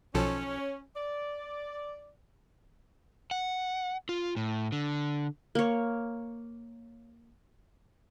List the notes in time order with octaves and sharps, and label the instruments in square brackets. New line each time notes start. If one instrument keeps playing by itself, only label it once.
[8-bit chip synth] B1 F3 A4 [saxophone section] C#4
[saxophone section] D5
[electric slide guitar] F#5
F4
A2
D3
[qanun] A#3 C#5